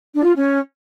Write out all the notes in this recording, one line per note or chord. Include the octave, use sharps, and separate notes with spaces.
D4
F4
C#4